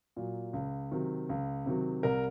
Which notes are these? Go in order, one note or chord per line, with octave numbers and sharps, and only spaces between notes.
A#2 F#3
C#2
C3 D#3 F#3
C#2
C3 D#3 F#3
C2 A#4